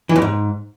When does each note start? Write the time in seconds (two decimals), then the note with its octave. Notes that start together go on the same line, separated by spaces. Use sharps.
0.09 E3
0.16 F2
0.22 G#2